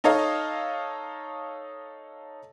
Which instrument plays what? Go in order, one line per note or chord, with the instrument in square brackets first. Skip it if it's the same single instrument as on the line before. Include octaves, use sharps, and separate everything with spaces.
[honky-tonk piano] D#4 A4 C#5 D#5 F5